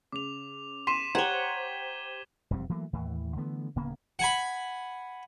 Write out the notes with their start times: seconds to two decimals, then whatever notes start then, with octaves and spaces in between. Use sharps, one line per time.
0.12 C#3 D6 F7
0.87 C6 B6 D#7 E7
1.15 G4 C5 C#5 F#5 A#5 G#6 E7 G7
2.51 E1 F2 G3 C4
2.69 E3 F#3 A3 A#3
2.93 D#2 A2 E3
3.36 D3 E3 A3 B3
3.76 D1 C#3 A#3 B3
4.19 F#5 G#5 B5